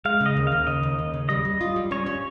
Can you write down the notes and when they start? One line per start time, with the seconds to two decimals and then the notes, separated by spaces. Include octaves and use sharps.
0.05 G#3 F5
0.21 C#3
0.26 D#5
0.37 D#2
0.47 D#2 F5
0.67 C#3 D#5
0.83 D#2
0.99 D#2
1.14 C#3
1.29 G3 D#5
1.45 G3
1.61 F4
1.76 G3
1.91 C#4 C#5
2.06 C#4